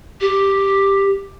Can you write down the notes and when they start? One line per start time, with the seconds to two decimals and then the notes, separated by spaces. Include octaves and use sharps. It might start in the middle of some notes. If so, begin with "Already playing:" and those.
0.20 G4